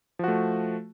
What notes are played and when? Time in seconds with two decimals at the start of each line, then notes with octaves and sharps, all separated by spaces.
0.19 F3
0.24 F#4
0.28 A3